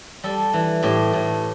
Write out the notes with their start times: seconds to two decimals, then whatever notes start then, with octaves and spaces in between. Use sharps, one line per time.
0.24 G3 A4
0.54 E3
0.83 A2 G4
1.13 A2